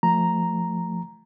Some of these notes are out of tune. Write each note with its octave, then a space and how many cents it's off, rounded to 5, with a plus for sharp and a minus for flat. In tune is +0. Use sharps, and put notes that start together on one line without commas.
F3 +0 A3 +5 A#5 +0